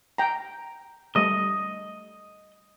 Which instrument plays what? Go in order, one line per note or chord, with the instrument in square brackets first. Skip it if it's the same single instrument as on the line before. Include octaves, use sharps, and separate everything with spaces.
[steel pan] G5 A#5
[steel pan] G3 A3 [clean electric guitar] D#5